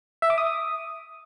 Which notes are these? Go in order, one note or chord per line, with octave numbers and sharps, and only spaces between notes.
E5
D6
D#6